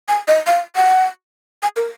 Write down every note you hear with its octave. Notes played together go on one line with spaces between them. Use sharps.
G#5
D#5
F5
F#5
G#5
A#4